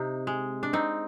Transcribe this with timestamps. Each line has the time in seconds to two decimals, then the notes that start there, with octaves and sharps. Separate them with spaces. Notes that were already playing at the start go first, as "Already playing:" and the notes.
Already playing: C3 D#4
0.27 G#3
0.63 D4
0.73 C4 D#4